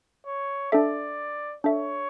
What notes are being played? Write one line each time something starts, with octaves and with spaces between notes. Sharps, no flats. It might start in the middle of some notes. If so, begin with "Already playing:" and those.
C#5
D4 A4 D5 E5
D4 A4 C#5 E5